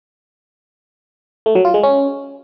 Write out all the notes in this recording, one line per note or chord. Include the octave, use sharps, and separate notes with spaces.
A3
F#3
F4
G#3
C#4